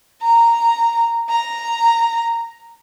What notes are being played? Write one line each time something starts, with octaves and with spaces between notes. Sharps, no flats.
A#5
A#5